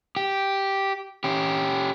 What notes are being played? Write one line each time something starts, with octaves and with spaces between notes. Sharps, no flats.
G4
C#4 G4